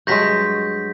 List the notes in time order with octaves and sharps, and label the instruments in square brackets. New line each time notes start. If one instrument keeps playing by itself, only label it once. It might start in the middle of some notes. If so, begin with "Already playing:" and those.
[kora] G2 F#3 G#3 [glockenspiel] G6 A#6 B6